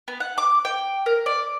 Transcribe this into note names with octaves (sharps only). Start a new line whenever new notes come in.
B3
F#5
D6
G5
A#4
D5